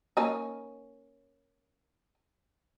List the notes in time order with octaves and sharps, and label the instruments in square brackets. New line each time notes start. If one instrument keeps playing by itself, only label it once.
[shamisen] A#3 C#4 D#4